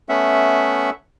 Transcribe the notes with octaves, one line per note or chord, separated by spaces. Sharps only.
A3 B3 C#4 E5 F#5